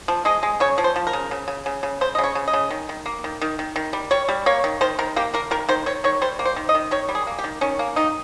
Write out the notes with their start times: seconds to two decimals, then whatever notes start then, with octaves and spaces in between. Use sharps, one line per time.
0.08 F3
0.25 G#3 D#5
0.43 G#3
0.60 C#3 C#5
0.78 F3
0.84 C5
0.96 F3
1.07 A#4
1.13 C#3
1.31 C#3
1.48 C#3
1.66 C#3
1.83 C#3
2.01 C#3 C5
2.15 D#5
2.18 C#3
2.24 C#5
2.35 C#3
2.47 D#5
2.53 C#3
2.70 D#3
2.89 D#3
3.06 A#3
3.24 D#3
3.41 D#3
3.59 D#3
3.76 D#3
3.93 G3
4.11 G3 C#5
4.29 G3
4.46 A#3 C#5
4.64 D#3
4.81 D#3 C5
4.99 D#3 A#4
5.16 A#3 G4
5.34 A#3 A#4
5.51 D#3 A#4
5.69 D#3 C5
5.86 D#3 C#5
6.04 D#3 C#5
6.21 G3 C5
6.39 A#3
6.45 C5
6.56 D#3
6.69 D#5
6.75 D#3
6.91 D#3 C#5
7.09 G3
7.15 G#4
7.27 A#3
7.38 G4
7.44 D#3
7.61 D#3 C#4
7.79 A#3
7.96 D#3 D#4